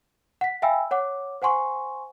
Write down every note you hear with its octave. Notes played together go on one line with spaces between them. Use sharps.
F#5 B6
E5 F5 G5 G#5 B5 E6
C#5 F#5 D6
C5 F#5 G#5 C6 C#6